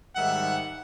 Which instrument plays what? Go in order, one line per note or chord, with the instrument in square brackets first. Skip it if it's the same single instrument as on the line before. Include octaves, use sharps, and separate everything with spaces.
[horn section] G#2 D#3 G3 E5 F#5